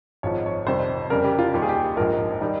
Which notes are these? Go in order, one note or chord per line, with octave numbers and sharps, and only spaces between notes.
G#1 G#2 F3 C#5
C#5
F2 C3 D#3 G3 C5
F2 C#3 G3 A#4
G4
F4
D#2 D#3 G3 G4
G#4
G4
A#1 G#2 F3 A#4
D#3 G3 D#4